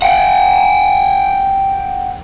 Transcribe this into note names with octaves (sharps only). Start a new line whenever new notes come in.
F#5 G5